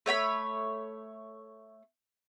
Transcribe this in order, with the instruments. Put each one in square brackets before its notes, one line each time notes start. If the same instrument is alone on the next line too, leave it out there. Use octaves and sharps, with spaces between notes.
[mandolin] A3 C#5 G5 B5